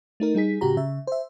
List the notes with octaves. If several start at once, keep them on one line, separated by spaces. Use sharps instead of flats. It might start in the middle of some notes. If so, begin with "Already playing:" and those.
A3 D#4 A#4
G3 D#4 G#4 B6
A2 C#3 F#4 G4 A#5
C#3 E5
C5 E5